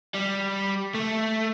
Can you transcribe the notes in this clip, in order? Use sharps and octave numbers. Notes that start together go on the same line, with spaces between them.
G3
A3